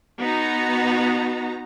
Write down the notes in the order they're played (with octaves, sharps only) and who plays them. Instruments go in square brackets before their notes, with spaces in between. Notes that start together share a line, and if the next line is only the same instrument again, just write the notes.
[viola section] B3 D#4 F#4 A#5